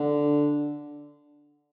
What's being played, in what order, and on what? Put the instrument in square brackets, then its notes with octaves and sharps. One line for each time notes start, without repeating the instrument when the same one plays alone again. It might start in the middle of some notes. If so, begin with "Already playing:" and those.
Already playing: [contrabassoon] D3